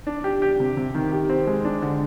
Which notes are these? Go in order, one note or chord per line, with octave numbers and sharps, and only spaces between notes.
D4
G4
G4
C3
C3
D#3
G4
C4
G#3
D4
D3